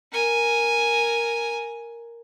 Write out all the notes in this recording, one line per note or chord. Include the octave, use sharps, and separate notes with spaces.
A#4 G#5